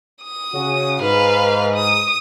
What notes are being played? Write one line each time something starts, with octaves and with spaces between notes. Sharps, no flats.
D#6
C#3 C#4 F#4
G#2 B4 F5
D#6